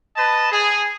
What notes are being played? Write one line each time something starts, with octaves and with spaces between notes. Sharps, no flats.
B4 D#5 A5
G#4